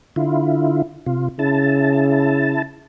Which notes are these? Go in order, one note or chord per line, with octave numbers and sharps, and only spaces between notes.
D3 E4 F4
C3 F4
C#3 E4 A5